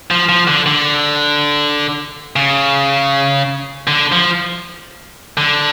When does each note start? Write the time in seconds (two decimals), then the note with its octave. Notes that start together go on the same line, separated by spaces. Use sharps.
0.11 F3
0.29 F3
0.48 D3
0.67 D3
2.36 C#3
3.87 D3
4.12 F3
5.37 D3